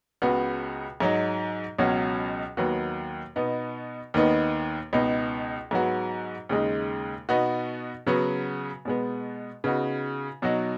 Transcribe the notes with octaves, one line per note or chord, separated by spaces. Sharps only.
C#2 C#3 B3 F#4
G#2 F#3 D#4
C#2 B2 F#3 C#4 F#4
D#2 D#3 F#3 B3 F#4
B2 B3 D#4
D#2 D#3 B3 D#4
C#2 B2 B3 D#4
G#2 F#3 B3 F#4
D#2 C#3 G#3 D#4
B2 B3 D#4 F#4
C#3 F#3 B3 F#4
B2 G#3 B3
C#3 B3 D#4 F#4
B2 F#3 D#4 F#4